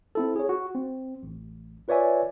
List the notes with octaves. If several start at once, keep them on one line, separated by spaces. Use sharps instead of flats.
C4 E4 A4
G#4 C#5
F#4
C4
A1
F4 B4 C#5 D5 E5 G#5